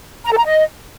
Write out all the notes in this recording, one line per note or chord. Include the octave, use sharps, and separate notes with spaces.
A#5
A4
A#5
D#5